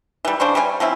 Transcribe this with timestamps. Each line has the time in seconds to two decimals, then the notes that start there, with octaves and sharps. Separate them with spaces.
0.25 E3 G3
0.40 C#3 D4 C5 C#6
0.55 G3 C#4 C#5 G#5
0.80 F3 C4 C#4 E4